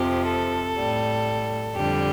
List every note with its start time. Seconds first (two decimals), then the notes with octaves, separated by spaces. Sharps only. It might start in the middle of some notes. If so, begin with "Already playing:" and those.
Already playing: F2 C3 F3 G4
0.27 A4
0.77 A2 G3
1.77 F2 D3 G3 G4